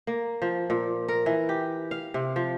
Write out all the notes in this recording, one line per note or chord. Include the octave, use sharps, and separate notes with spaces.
A#3
F3
A#2
A#4
E3
G4
F5
C3
F3